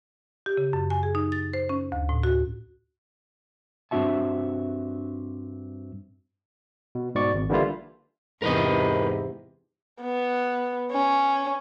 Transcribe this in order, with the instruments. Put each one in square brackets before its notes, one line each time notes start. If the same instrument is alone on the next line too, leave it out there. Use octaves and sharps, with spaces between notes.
[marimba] G4
C#3
F#2
G#5
G#4
D#4
A6
C5
C#4
D2
A2
F#4
[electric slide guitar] G2 C4 D4 F#4 E5 A5
[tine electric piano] B2
G#2 B2 D5 C#6
G#1
D3 E3 G3 A#3 E4 F4
[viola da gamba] E2 C3 [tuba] G#2 [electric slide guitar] A#4 B4 D#5
[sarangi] B3
C#4